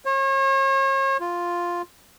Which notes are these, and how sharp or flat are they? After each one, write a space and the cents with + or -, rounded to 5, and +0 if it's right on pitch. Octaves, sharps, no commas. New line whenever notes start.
C#5 -40
F4 +0